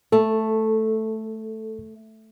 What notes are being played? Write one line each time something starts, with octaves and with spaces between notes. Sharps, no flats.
A3 A4